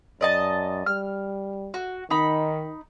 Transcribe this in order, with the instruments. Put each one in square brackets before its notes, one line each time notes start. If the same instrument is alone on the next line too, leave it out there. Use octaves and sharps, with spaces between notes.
[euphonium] F#2 [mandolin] D5 D#5 A5
[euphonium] G3 [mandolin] F6
[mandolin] F#4
[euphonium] D#3 [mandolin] D#4 B5